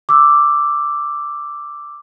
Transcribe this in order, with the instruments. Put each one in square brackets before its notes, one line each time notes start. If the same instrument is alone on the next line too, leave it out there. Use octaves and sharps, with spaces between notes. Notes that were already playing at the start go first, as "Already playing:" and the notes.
[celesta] D6 E6